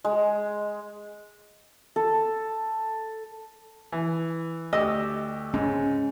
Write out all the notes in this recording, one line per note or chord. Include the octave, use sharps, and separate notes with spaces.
G#3
A4
E3
D2 G4 D#5 E6
G#2 C#3 C#4